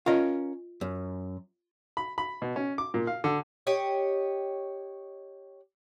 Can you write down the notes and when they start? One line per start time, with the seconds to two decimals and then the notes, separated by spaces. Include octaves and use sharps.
0.06 C#4 F4 A#4 D#5 F5
0.81 F#2
1.97 B5
2.18 B5
2.42 B2
2.56 C#4
2.78 D6
2.94 A#2
3.07 F5
3.24 D3
3.67 G4 C#5 D#5